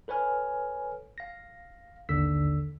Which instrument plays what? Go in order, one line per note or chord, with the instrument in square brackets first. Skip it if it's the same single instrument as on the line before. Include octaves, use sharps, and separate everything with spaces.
[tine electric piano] A4 B4 C#5 G#5 F6
F5 A#6
A1 D#2 D3 E6 B6